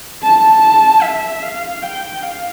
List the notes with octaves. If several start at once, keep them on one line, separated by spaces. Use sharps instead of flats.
A5
E5
F5
G5
F5